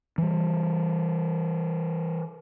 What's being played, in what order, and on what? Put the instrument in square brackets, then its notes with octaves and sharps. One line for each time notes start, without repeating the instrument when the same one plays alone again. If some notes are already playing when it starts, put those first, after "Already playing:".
[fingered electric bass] E3 G3